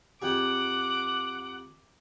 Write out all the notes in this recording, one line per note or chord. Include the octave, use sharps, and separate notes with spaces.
F2 G4 G#4 F#5 D6